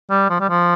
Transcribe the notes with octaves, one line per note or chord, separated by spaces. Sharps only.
G3
F3
G3
F3